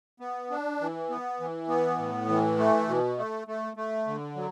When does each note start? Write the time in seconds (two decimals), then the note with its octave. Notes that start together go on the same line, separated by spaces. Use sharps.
0.20 B3
0.51 D4
0.80 E3
1.10 B3
1.40 E3
1.68 B3
1.98 A2
2.29 E3
2.58 A3
2.88 B2
3.18 A3
3.48 A3
3.77 A3
4.07 D3
4.36 F#3